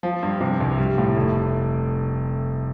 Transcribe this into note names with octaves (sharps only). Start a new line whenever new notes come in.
F3
G2
C3
C2
G3
A2
F1